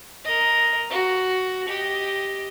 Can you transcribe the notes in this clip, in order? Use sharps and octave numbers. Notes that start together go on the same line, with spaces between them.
A#4 D#5
F#4
G4 D#5